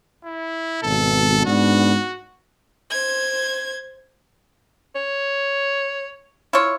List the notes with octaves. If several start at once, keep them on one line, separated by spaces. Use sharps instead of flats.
E4
G#1 B2 A4
G#2 B3 D4 F#4
C5 G#6
C#5
E4 F4 C#5